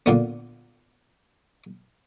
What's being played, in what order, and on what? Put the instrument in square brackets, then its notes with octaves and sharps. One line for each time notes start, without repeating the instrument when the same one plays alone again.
[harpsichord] A#2 D3 B3